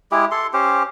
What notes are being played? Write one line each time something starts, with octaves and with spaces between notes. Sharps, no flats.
G#3 E4 G4 G#4
A4 C6
C#4 G4 C5